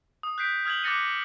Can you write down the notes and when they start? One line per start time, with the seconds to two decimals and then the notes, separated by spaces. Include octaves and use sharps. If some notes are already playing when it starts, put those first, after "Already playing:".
0.23 D#6
0.38 F#6 G6 B6 C7 D7
0.65 D#6 F6 G#6 F7 F#7
0.83 D6 F#6 A6 A#6 C#7 D#7